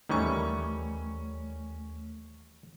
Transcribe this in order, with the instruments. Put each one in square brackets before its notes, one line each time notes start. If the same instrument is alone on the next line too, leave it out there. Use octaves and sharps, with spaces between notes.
[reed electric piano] D#2 A3 [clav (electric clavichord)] D#3 E3 G3 [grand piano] C#4 C#6